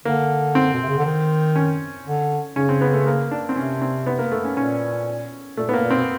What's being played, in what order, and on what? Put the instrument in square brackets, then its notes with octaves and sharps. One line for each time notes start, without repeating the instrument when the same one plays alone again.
[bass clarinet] D3 [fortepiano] A#3
[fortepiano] C4
[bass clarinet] B2
C3
C#3
D3
D#3
[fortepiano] C#4
[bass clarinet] D3
[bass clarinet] C#3 [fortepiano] C#4
[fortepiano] C4
B3
A3
A#3
D4
C4
[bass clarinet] C3 [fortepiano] C#4
[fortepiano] C4
B3
A#3
A3
C#4
[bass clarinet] A#2 [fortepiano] C#4
[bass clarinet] A#2 [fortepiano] A3
[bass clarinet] A2 [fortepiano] A#3 B3
[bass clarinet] A#2
[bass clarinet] B2 [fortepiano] C4